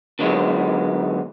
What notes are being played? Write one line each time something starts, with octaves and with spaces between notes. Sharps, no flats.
D3 D#3 F#3 G#3 B3